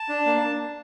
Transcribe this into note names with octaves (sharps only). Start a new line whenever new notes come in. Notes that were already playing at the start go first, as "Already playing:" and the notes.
Already playing: A5
D4
A#3